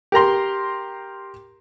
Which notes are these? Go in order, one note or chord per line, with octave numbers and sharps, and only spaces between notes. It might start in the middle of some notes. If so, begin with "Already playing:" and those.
G4 A#4 A#5 C6